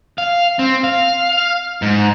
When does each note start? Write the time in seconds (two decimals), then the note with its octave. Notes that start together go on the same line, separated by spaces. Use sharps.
0.18 F5
0.59 C4
0.84 F5
1.82 G#2